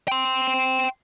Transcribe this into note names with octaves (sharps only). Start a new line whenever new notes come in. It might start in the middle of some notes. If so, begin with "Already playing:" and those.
G5 C6